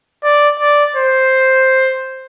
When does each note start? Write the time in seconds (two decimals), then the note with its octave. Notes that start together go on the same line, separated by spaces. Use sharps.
0.24 D5
0.60 D5
0.96 C5